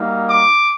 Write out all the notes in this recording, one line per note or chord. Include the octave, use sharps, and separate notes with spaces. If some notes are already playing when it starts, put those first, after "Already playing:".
Already playing: G3 A#3 D#4 F#4
D6